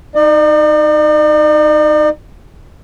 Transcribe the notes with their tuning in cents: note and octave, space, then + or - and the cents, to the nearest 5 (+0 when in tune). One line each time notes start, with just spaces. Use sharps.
D#4 +0 D5 +45